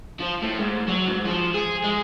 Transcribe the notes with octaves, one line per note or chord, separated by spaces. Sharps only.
F3
A2
G#2
F#3
G#2
F3
G#4
G#3